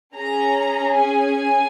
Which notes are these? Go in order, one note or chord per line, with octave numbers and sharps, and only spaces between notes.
C#4 G#4 A#5
G#5